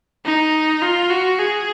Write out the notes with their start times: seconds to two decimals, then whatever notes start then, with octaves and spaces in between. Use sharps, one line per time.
0.25 D#4
0.82 F4
1.10 F#4
1.39 G#4